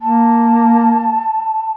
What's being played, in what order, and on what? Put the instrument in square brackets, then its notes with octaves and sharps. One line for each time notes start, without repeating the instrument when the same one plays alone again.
[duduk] A#3 [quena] A5